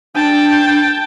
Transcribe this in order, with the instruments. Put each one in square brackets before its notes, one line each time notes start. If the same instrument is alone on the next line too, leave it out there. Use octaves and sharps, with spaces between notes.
[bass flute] D4 [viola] G5 A5